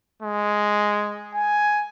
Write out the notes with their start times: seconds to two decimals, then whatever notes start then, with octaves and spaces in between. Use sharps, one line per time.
0.22 G#3
1.35 G#5